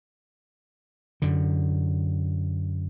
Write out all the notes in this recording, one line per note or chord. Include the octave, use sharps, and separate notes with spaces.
F#2 D3